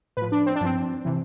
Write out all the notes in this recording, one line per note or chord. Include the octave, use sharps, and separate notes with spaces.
A2 F3 B4
D4
C4
D4
G2 F3 C4
C3 E3